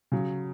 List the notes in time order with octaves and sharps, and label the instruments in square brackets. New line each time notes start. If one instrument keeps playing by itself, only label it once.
[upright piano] C#3 F#3